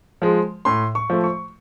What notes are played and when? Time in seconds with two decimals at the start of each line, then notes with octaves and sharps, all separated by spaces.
0.22 F3 G#3
0.65 A2 C6
0.95 C#6
1.10 F3 A3
1.24 C#6